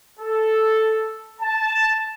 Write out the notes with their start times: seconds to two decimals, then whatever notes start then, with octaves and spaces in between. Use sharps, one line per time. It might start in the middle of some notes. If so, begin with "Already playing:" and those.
0.20 A4
1.41 A5